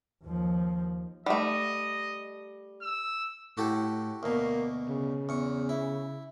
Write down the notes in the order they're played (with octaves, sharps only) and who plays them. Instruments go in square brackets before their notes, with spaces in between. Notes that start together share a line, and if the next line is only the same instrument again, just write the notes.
[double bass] D#2 F3
[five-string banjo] G3 A3 [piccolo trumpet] D#5
[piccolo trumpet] E6
[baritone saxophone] A2 [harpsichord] F#4 G4 A4
[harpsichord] D2 B2 [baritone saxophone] A#3
[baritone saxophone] C#3
[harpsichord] E2 C#6
E4